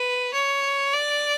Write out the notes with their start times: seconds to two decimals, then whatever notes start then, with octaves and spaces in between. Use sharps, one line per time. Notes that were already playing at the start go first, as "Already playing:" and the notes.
Already playing: B4
0.33 C#5
0.93 D5